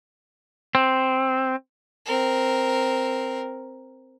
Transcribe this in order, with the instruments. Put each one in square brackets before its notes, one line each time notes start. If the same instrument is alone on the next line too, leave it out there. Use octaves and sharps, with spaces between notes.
[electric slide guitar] C4
[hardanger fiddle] C4 A#4